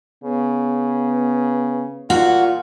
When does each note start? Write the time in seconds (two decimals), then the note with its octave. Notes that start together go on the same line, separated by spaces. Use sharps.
0.24 C#3 B3
2.10 A#2 F4 F#4